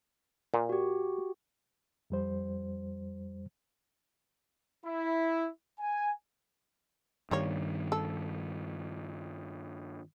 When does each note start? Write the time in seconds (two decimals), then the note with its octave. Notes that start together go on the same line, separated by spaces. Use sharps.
0.54 A#2
0.69 F#4 G4
2.10 F2 G3 C5
4.85 E4
5.80 G#5
7.31 G2 D#3 G3 A#3 C#5
7.92 A4